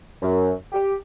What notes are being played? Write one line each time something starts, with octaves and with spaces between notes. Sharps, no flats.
F#2
G4